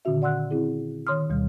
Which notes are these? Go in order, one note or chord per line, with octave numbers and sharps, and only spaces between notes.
A#2 D3 D#3 C#4 F#4 E5
D5 F#5 C6 E6 F#6
C4 E4 G#4
D#3 C#5 C6 D#6 F6
D2 B2 G3